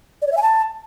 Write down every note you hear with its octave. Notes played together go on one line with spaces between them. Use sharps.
D5
C#5
E5
G#5
A5